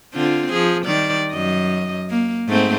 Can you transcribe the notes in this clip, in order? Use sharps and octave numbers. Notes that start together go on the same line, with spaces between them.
D3 C4 F4
F3 G#4
D#3 G3 D5
F#2 D#5
A#3
G#2 A3 C4